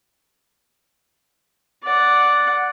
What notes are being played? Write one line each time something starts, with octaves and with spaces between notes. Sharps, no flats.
D5 F#5